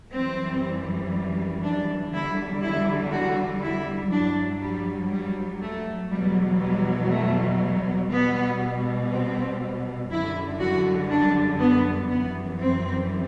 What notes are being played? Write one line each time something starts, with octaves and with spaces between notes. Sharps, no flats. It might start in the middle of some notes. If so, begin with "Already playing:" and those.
F#2 E3 G3 C4
D4
E2 D3 G3 E4
E4
F#4
E4
G2 F#3 D4
G3
G3
A3
E2 B2 F#3 G3
G3
A3
G3
B2 G3 B3
C4
F#2 D3 G3 E4
F#4
D4
B3
F#2 E3 G3 B3
C4